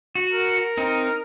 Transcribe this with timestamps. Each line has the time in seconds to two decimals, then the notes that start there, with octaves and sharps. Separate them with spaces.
0.15 F#4
0.33 A#4
0.77 C4 D#4